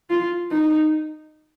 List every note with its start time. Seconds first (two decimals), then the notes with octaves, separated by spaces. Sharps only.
0.10 F4
0.50 D#4